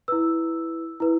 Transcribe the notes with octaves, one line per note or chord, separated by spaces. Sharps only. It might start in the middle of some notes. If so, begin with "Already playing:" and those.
E4 B4 E6
E4 B4